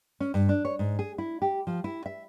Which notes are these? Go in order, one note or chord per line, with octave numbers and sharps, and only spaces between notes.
C#4
G2
D4
C#5
G#2
G#4
E4
G4
F3
E4
E5